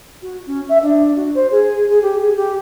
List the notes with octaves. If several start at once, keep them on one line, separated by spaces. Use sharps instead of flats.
F#4
C#4
E5
D4
F#4
C5
G#4
G#4
G4
G#4
G4